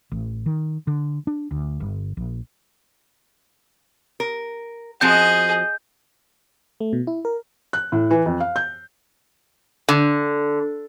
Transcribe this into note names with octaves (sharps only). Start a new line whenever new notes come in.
A1
D#3
D3
D4
D2
G1
A#1
A#4
F3 C4 F#4 G#4 D#5 G6
A3
B2
E4
A#4
F#6
A2
E3
F2
F5
G6
D3